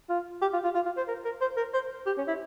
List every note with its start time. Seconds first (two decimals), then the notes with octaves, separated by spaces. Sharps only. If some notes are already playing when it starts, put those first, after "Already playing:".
0.09 F4
0.42 G4
0.53 F4
0.64 F4
0.75 F4
0.86 F4
0.97 C5
1.08 A#4
1.25 A#4
1.41 C5
1.57 A#4
1.74 C5
2.06 G4
2.18 C#4
2.28 E4